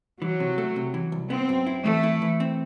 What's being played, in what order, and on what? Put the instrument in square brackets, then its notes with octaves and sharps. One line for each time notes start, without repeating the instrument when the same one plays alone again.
[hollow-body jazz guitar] E3 [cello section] F#3
[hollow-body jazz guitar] C3
A3
C3
E3
C2
[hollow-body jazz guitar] B3 [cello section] C4
[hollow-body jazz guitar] F#2
E4
[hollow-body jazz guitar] E3 [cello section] A3
[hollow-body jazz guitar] E4
E3
C4